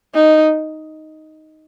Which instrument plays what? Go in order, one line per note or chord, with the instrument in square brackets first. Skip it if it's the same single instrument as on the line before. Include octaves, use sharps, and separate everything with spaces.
[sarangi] D#4